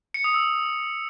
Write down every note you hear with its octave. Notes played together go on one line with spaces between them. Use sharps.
C#7
D#6
E6